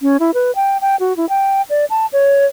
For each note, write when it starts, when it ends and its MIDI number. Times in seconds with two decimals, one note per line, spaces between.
0.02 0.17 61
0.20 0.31 64
0.34 0.54 71
0.55 0.78 79
0.81 0.96 79
1.00 1.16 66
1.17 1.28 64
1.29 1.62 79
1.70 1.85 74
1.90 2.06 81
2.13 2.46 73